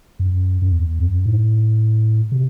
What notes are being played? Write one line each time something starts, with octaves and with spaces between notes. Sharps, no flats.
F#2
F#2
E2
F#2
A2
C3